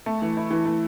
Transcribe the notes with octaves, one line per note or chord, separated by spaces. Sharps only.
A3
E3
E4
E3
A3